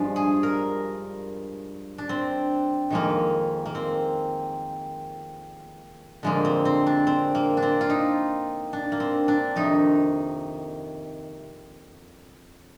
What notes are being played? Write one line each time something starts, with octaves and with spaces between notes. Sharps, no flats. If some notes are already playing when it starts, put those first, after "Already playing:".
Already playing: G2 F3 G#3 D4
G#4
A#4
D4
C4
F2 D#3 G#3 A#3
A#3
C4
F2 D3 G#3 A#3
C4
C4
D4
C4
A#3
D4
C4
F4
D#4
D4
A#3
C4
D4
F2 C3 D#3 D#4